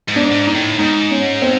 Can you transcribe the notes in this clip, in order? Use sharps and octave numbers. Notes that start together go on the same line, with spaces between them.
G#2
D4
G#2
D#4
A2
G#2 D#4
C#4
C4